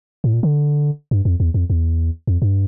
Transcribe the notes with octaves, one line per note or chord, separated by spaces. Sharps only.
A2
A#2
D3
G2
F2
E2
F2
E2
F2
G2